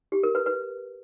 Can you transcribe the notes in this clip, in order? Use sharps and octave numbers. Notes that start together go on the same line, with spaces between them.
G4
A#4
B4
B4